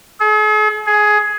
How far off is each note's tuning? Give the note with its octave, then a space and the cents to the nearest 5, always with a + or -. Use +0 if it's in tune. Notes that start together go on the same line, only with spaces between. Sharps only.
G#4 +45
G#4 +15